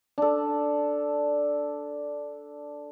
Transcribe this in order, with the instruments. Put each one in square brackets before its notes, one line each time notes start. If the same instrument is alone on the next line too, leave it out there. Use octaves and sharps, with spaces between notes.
[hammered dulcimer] D4 A4